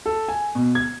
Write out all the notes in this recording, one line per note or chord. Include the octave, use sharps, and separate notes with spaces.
A4
G#5
B2
G#6